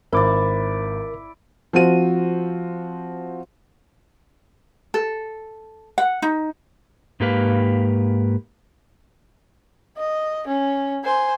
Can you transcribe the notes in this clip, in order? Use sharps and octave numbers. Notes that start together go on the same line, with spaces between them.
G#1 E4 A#4 D5 D6
F3 C4 F#4 D#7
A4
F#5
D#4
G#2 A#3 G4 B4 F5
D#5
C#4
C5 G#5